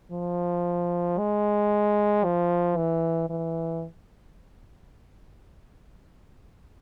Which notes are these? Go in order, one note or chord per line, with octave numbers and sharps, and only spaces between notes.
F3
G#3
F3
E3
E3